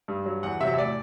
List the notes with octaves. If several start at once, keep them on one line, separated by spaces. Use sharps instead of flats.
G2
F#3
E2 F#5
C3 F#3 E5
E5
A2 D5